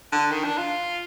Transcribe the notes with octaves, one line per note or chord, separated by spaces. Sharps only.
D3
D#3
D4
F4